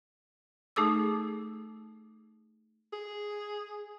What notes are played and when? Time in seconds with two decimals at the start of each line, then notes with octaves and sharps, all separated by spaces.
0.76 A3 D#4 G#4 A4 D6 E6
2.92 G#4